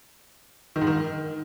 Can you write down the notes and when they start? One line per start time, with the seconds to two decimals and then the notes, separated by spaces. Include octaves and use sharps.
0.76 D#3
0.81 G#2
0.87 D#3